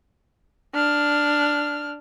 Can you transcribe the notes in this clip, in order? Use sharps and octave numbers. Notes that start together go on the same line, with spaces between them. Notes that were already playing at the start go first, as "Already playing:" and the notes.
D4 F6